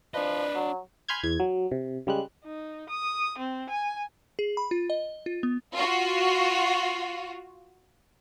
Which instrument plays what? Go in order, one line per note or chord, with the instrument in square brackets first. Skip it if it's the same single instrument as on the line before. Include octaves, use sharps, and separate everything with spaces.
[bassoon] F3 [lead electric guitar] D4 D#5 [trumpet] B4 [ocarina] D5
[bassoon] F#3
[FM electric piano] G#5 B5 C6 F6 G6 G#6
E2 G#6
F#3
C3
C#3 G3 G#3 F#6
[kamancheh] D#4
D#6
C4
G#5
[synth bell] G#4
B5
F4
D#5
F4
B3
[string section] F4 F#4